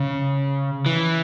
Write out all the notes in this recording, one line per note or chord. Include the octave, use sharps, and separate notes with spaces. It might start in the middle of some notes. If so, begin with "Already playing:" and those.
Already playing: C#3
E3